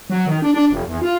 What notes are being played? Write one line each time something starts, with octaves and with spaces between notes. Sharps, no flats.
F#3
D#3
D4
D4
F1
E2
F4